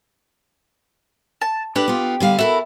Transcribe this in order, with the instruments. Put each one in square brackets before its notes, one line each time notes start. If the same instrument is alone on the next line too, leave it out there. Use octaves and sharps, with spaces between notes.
[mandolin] A5
[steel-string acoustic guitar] D4 A4 B4 [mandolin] G4
[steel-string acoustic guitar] B3 F4
D3 G3 F5
[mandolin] E4 [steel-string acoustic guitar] F#4 A4 A#4